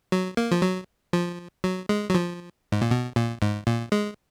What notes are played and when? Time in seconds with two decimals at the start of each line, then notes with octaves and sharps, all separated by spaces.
0.12 F#3
0.37 A#3
0.51 F3
0.62 F#3
1.13 F3
1.64 F#3
1.89 G#3
2.10 F#3
2.14 F3
2.72 G#2
2.82 A#2
2.91 B2
3.16 A#2
3.42 G#2
3.67 A#2
3.92 G#3